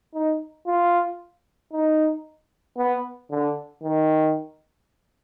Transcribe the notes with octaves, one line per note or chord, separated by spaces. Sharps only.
D#4
F4
D#4
B3
D3
D#3